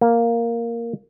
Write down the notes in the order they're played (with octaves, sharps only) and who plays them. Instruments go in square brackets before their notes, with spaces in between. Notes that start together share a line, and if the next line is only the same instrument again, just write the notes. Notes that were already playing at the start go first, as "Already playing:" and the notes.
[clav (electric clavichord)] A#3